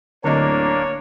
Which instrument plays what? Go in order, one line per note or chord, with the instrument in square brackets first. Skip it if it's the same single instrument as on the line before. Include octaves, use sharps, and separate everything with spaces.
[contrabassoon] D1 [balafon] D3 D#5 [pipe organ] A#3 D4 [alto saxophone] C#5